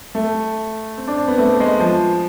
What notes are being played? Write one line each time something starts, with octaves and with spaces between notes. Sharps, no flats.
A3
C4
D4
C4
B3
A3
G#3
F3